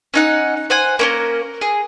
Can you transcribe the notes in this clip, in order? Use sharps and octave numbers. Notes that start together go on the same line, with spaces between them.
C#4 D#4 F#5
C5 F#5 G#5
A#3 C#4 A#4
G#4